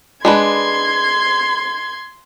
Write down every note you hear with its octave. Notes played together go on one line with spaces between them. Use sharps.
G#3 D4 B4 C6 G#6